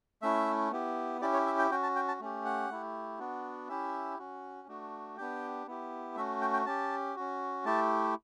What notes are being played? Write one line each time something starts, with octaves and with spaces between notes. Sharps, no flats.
A3 C#4 E4 E5
B3 E4 G4
C#4 E4 G4 D5
C#5
E5
G5
C#4 F#4 G5
A5
G5
A5
A3 C#4 G4
F#5
A3 E4 G4
B3 D4 F#4
C#4 E4 G4 E5
C#4 F#4
A3 D4 F#4
B3 D4 G4 G5
B3 E4 G4
A3 C#4 F#4 E5
G5
G5
C#4 G4 A5
C#4 F#4
A3 E4 G4 A5